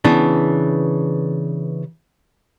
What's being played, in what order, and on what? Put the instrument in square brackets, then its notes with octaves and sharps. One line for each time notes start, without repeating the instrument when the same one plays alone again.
[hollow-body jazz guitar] C#3 E3 B3 D4